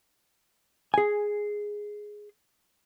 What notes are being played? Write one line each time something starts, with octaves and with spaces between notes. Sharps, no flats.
G#4 G#5